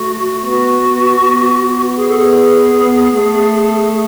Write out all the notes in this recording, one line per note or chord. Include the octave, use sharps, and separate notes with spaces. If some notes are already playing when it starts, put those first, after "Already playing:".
Already playing: A3 F#4
B3 F#4
B3
B3
G#4
A4
G#4
B3
A3